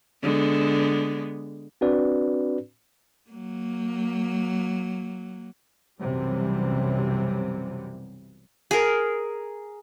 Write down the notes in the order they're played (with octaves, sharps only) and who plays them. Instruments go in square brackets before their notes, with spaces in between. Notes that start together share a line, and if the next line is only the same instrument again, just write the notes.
[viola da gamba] D3 G#3 B3
[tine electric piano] C4 D4 F#4 B4 D5
[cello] F#3 A#3
[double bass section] B1 F#2 C3 E3 G3
[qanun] G#4 A#4